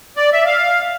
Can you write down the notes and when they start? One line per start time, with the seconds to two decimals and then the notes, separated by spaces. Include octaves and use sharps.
0.17 D5
0.33 E5
0.45 F5